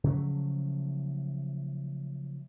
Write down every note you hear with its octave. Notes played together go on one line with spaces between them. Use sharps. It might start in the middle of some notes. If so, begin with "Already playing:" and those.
C#3 F3 F#3 A3